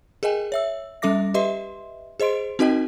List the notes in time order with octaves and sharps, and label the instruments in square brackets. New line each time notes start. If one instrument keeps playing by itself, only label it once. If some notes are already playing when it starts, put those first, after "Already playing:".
[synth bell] G#4 A#4 D#5 G5 G#5
C#5 E5 E6
G3 C#4 A4 E5 D6 A#6
G4 B4 D#5 E5 C6
G#4 C5 D#5 C6 D7
C4 D#4 F#4 A#4 D#5 G5